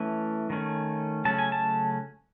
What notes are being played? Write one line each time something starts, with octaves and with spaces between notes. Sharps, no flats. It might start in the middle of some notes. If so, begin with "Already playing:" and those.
Already playing: E3 A3 C#4
D#3 A3 C#4
C#3 F#3 A3 C#4 A5
G#5
A5